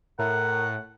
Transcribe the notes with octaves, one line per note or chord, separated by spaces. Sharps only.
A2 A#4 F#5